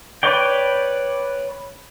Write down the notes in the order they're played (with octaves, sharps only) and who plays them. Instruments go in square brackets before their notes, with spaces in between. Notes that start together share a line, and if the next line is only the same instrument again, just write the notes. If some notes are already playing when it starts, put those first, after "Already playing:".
[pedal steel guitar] B4 C#5 D5 G5